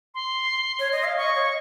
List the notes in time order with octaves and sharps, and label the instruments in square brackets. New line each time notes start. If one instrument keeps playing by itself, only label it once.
[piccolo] C6
[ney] C#5
D#5
F5
[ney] D#5 [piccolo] C#6
[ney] C#5